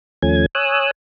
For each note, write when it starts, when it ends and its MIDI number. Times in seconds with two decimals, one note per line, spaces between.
0.22 0.46 39
0.22 0.46 53
0.22 0.46 57
0.22 0.46 61
0.22 0.46 80
0.22 0.46 92
0.55 0.91 73
0.55 0.91 80
0.55 0.91 87
0.55 0.91 88
0.55 0.91 90